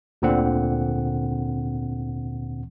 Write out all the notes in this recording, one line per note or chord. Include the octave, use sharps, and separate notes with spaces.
D2 A#2 D3 C4 F#5